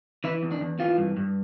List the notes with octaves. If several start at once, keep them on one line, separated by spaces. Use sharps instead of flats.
E3 E4
E2
D4
E2
E3 F4
G2
G2